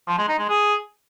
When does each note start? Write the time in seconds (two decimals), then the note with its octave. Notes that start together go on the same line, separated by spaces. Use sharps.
0.08 F3
0.18 G#3
0.29 D#4
0.39 G#3
0.49 G#4